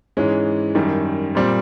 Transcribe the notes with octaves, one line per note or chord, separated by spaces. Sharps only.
G#2 E3 G#3 C#4
F#2 D#3 G3
A#2 G3 C4